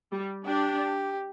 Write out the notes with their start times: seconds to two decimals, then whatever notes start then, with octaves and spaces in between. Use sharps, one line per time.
0.12 G3
0.45 D4 G4